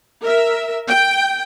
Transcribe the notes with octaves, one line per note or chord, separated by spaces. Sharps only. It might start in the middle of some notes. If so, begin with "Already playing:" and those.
A#4 E5
G5